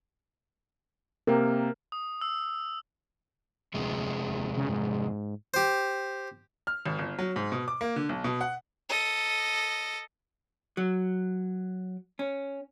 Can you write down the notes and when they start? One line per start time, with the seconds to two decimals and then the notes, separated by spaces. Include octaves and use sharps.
1.27 C3 A#3 A#4 G5
1.92 D#6
2.21 E6
3.74 D1 F2 C3 G#3
4.27 D#1
4.57 C#3
4.69 G#2
5.54 G4 C5
6.67 F6
6.86 G#1
6.99 G1
7.19 F#3
7.36 G#2
7.52 B2
7.68 D6
7.81 A#3
7.96 D3
8.09 B1
8.24 B2
8.41 F#5
8.89 A4 D#5
10.77 F#3
12.19 C#4